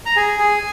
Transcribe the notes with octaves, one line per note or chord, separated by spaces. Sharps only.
A#5
G#4 G#5
G#4